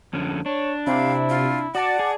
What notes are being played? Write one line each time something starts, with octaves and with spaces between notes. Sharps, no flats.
F2 D3 C#4
D4 C#5
C3 E4 F5
F4
F#4 D5 F#5 A5
G#4